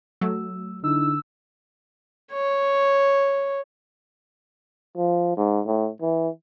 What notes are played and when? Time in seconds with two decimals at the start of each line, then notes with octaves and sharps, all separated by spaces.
0.21 F#3 A3 E6
0.84 D3 D#4 E4 E6
2.32 C#5
4.97 F3
5.37 G#2
5.66 A2
6.01 E3